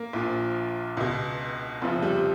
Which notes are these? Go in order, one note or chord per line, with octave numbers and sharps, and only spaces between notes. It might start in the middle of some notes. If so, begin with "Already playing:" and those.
Already playing: A#3
A#1 A#2 F3
C#2 B2
F1 F2 C#3 F3
G3